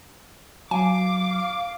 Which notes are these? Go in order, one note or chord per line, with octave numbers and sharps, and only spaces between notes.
F#3 F5 G#5 D6